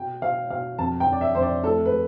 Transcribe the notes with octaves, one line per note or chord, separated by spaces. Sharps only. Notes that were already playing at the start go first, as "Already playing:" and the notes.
Already playing: B2 G5
B2 F5
B2 F5
F2 A5
G5
F2
D5
E5
F2 C5
D5
A3 A4
B4
A3